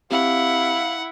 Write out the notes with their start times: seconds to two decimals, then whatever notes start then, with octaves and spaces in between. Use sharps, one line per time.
0.11 C4 E4 G4 F5 F#5